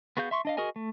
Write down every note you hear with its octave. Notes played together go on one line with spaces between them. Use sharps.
B3 F#4 G#4 F5 G6
E5 C6 C#6
D4 D#5 F5
F#4 G#4 A#4 D#5 G#5
A3